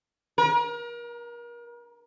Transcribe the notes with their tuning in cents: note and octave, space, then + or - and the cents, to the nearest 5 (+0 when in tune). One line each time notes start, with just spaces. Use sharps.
A#4 +35